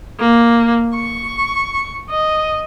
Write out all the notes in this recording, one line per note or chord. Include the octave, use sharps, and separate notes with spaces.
A#3
C#6
D#5